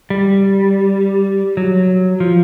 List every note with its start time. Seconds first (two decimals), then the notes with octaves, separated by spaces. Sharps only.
0.10 G3
1.57 F#3
2.20 F3